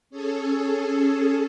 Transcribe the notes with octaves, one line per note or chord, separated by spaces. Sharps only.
C#4 G#4 A4